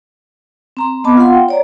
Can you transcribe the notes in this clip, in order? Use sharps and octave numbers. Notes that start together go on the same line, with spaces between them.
C4 A#5 C6
B3 C4 D#5 A5 B5 D6
F4 F5 F#5 C6
G5
C#5 D5 A#5